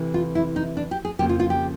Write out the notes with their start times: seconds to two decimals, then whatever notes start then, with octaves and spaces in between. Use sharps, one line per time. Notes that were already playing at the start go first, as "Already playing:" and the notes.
Already playing: C3 E3 A3
0.14 F4
0.35 E4
0.56 D#4
0.77 D4
0.91 G4
1.05 G#4
1.19 F2 C#3 F3 A#3 G4
1.29 F4
1.40 F4
1.50 G4